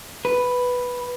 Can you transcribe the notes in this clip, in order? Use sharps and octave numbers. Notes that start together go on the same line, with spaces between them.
B4